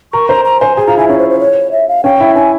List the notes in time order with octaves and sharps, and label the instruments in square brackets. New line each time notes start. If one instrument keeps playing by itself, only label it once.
[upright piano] A#4 [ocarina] C#6
[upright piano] C5 [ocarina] A#5
[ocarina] A#5
[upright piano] C5 [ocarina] G#5
[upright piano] G#4 [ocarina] G#5
[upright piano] F4 [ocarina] A#5
[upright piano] E4 [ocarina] G#5
[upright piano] C#4 [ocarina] C#5
[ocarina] C5
C5
C#5
E5
F5
[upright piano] C#4 [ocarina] G5
[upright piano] E4
[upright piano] C#4 [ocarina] G#5